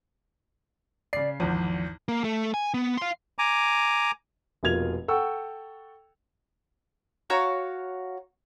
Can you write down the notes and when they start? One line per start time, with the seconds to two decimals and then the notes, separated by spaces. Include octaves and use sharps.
1.13 C#3 D5 C7
1.40 G#1 E2 F3
2.08 A#3
2.24 A3 A4
2.54 G#5
2.74 B3
2.97 F5 C6
3.39 G#5 A#5 D6
4.63 F1 B2 A#3 F4 G#6 F7
5.08 A4 F#5 G5 C#6 E6
7.30 F#4 C#5 F5 A#5